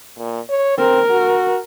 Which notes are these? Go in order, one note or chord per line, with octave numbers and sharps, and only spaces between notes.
A#2
C#5
C4 A#4
F#4